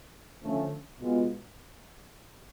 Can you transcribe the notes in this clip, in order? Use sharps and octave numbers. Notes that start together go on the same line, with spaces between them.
D3 F3 A3 C#4
B2 G#3 B3 F4